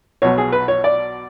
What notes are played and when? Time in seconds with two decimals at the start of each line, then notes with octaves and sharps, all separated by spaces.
0.22 B1 B2 F#3 C#5
0.38 G#4
0.52 B4
0.68 C#5
0.84 D5